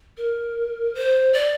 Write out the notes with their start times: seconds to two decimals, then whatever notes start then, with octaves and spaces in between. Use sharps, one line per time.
0.17 A#4
0.95 C5
1.33 D5